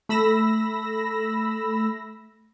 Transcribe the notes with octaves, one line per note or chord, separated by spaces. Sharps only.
A3 B5 E6 A#6